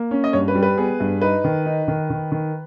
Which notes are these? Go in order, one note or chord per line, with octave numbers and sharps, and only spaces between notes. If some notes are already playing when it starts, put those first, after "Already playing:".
Already playing: A#3
C#4
D#5
G2 C#5
B4
G3
B4
B3 G#4
G2
D#4 B4
D#3
D#4
D#3
D#3
D#3